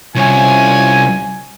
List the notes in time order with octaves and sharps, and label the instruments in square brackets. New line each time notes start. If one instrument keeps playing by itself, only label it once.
[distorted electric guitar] C2 [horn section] C#4 F4 G#5